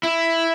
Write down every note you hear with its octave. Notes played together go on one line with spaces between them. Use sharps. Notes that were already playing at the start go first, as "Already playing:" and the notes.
E4